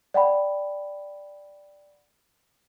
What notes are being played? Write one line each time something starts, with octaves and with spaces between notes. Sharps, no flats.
D5 F#5 G5 B5